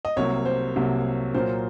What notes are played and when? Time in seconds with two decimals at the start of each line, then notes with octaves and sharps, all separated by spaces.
0.05 D#5
0.16 C2 C3 F#3 A#3 C#5
0.45 C5
0.76 C2 C3 F#3 A#3
1.34 A#2 F#3 A#3 C5